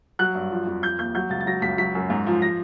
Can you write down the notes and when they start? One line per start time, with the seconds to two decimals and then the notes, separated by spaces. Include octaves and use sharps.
0.19 F#3 F#6
0.35 G2
0.51 F3
0.67 F2
0.83 F3 G6
0.99 D#2 G6
1.15 F#3 G6
1.30 C#2 A6
1.41 A6
1.46 F#3 A#6
1.62 C#2 B6
1.78 F#3 B6
1.95 F#2
2.10 G#2
2.27 F3
2.42 F3 A#6